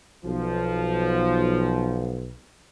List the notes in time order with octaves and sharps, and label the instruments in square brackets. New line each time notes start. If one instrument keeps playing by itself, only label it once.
[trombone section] B1 [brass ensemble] F3